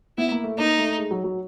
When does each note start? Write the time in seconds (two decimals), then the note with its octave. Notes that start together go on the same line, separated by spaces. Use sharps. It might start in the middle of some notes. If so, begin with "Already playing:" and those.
0.18 B3 E4
0.31 A#3
0.44 A3
0.58 A#3 D#4
0.78 A3
0.98 G#3
1.11 F#3
1.24 F#3